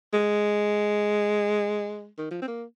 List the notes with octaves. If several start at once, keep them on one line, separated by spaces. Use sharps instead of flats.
G#3
D#3
F3
C4
A#3